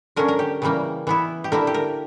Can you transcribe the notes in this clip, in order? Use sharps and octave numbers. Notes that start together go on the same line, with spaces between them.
D3 F#3 C#4 A#4
A#4
G4
C#3 E3 G3 A#3
E3 B3 E4
G4
D3 A#3 E4 A#4
G4
A#4